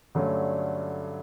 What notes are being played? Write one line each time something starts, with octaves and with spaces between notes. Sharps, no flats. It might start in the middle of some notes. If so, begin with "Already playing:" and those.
G2 D3 F#3 A3 C#4